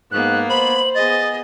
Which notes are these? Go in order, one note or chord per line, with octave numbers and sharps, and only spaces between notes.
G#2 A#3 B3 F#6
C5 B5 F#7
B3 G#4 D#5 A6